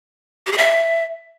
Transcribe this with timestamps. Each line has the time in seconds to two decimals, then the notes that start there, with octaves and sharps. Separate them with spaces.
0.46 G4
0.52 G#4
0.58 E5